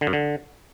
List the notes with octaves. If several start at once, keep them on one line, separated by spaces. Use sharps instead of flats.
D3
F#2
D3